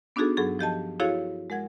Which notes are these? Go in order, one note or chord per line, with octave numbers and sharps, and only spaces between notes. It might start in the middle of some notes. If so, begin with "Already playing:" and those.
B3 D4 D#4 F#4 G#4 A4
G2 F#3 G#4 A4 C#6
F3 G4 D#5 A5
E4 F#4 G#4 A4 C#5 F5
G#3 A#4 F#5 G#6